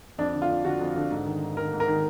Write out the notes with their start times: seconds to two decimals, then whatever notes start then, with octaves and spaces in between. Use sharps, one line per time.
0.18 F2 D4
0.34 D3
0.42 F4
0.49 F2
0.65 D3 F#4
0.81 F2
0.96 D3
1.11 G#2
1.26 D#3
1.42 G#2
1.57 D#3 A#4
1.73 G#2
1.80 A#4
1.88 D#3